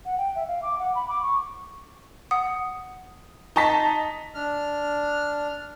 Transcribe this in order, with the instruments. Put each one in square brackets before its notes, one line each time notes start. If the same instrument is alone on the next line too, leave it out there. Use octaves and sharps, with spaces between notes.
[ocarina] F#5
G5
E5
F5
D6
F#5
B5
D6
C#6
[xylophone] F#5 D#6
[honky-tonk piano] D#4 A5 B6
[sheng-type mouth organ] D4 F6